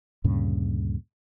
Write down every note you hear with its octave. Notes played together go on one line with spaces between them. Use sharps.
D2 G2 A#2 C#3